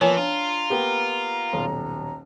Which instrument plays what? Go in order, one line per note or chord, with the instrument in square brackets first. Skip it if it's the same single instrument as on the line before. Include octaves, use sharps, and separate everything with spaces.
[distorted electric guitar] E3 [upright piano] F3 A#3 B3 [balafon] C#5 G#5
[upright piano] D4 [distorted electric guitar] F4 [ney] A#5
[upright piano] A#3 B3 G4
D#1 B1